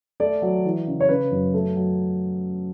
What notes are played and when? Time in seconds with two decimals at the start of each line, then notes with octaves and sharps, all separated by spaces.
0.20 A3 D5
0.42 F#3
0.65 E3
0.87 C#3
1.00 C#5
1.09 C#3 B4
1.31 F#2
1.54 A3
1.76 F#3